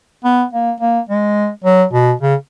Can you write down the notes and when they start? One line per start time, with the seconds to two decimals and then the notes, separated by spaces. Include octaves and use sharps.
0.24 B3
0.53 A#3
0.80 A#3
1.09 G#3
1.65 F#3
1.93 B2
2.22 C#3